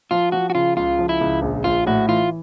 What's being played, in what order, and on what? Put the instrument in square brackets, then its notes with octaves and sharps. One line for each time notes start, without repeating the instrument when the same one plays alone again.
[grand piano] F3 [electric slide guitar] F4
[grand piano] F3 [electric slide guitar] F#4
[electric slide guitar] F#4
[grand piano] C#3 [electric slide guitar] F4
[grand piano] C#2 [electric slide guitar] F4
[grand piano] F3
[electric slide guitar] E4
[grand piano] C#2
A#1
[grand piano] A#1 [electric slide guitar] F4
[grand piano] A2 [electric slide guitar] F#4
[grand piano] E3 [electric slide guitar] F4